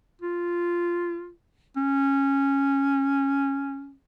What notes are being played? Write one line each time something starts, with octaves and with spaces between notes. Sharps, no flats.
F4
C#4